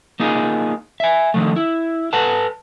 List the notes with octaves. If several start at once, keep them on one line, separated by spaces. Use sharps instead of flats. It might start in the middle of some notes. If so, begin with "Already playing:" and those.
A#3 D#4 F4 G#4
E5 G#5
D3 D#3 F3 A3
E4
A4 B4 F#5 A5